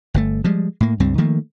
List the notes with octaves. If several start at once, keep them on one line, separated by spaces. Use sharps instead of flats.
G1 C3 A3
F3 G3 G#3
A2 A#3
C#2 G2 G3 C4
D#3 F3 A3 A#3